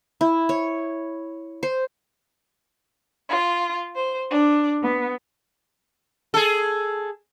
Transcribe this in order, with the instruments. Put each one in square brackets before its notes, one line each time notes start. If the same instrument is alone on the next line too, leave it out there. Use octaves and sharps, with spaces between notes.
[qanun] E4
C#5
C5
[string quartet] F4
C5
D4
B3
[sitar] G#4 A4